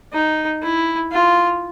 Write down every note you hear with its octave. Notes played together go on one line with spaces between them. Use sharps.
D#4
E4
F4